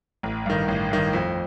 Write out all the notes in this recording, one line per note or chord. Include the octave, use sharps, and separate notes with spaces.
A1
G2 D#3
A1
G2 D#3
F2